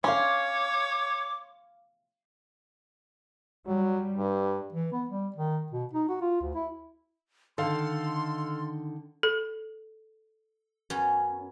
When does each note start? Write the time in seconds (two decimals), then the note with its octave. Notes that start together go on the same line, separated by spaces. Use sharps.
0.04 C#4 C#5 F5 C6 D6
3.67 F#3 G3
4.17 G2
4.73 E3
4.92 B3
5.09 G3
5.36 D#3
5.72 B2
5.93 D#4
6.09 F#4
6.21 F4
6.41 D2
6.55 E4
7.58 D3 D#3 A4 F5 C6
9.23 A4
10.90 F#2 B3 C#4